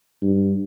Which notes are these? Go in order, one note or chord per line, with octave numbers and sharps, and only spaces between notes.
G2